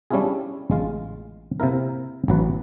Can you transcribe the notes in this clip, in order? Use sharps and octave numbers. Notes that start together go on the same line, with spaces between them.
G3 C#4 D4 E4 F4 G#4
A1 G#3 F4
C3 A#3 E4 A#4
A1 F#3 B4